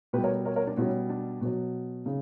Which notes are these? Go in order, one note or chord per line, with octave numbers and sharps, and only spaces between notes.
B2 G3 G4 B4
A#4 C#5
A#4 C#5
A#4 C#5
D4
B2 G3 C#4 E4
D4
B2 F#3
C#3